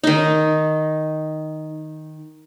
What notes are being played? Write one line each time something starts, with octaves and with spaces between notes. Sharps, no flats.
D#3 D#4